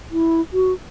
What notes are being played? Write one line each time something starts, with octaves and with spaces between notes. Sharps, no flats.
E4
F#4